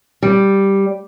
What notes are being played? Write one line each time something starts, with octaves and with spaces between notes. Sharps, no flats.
G3